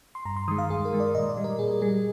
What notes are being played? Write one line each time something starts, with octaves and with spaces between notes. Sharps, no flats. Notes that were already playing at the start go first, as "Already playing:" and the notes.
C6
G2 A#5
C6
D#3 G#3 D#6
F5
G2 G#4
A#4
D#3 G#3
D5
A#2 D#5
D5
G3
A#4
A#2 G#4
G3 G#4